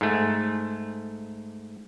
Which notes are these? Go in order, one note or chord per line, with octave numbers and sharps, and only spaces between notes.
G#2 A3